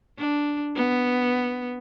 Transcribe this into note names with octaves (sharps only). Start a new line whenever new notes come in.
D4
B3